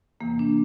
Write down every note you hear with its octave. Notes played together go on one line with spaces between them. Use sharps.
E2 C3 E3 A#3
D4